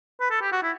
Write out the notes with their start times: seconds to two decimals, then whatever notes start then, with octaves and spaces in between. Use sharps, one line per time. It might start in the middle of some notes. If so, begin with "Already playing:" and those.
0.21 B4
0.31 A4
0.41 G4
0.52 F#4
0.63 E4